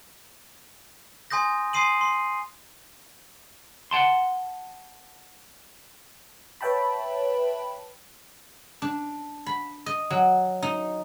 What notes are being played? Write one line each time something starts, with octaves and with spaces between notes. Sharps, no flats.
G#5 C6 D#6 G6 A#6
G#5 C6 D#6 C7 D#7 F#7
C6
F#5 G5 A5 C6
B4 C#5 E5 G5 A5 B5
D4
B5
D#5
F#3
D#4